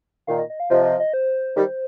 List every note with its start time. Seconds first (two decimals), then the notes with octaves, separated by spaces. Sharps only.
0.27 A#2 D#3 F5
0.39 D#5
0.50 D#5
0.60 F5
0.70 C3 F3 D#5
0.84 D#5
1.00 D#5
1.13 C5
1.56 D#3 G3